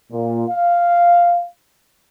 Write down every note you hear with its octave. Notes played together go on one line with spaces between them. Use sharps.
A#2
F5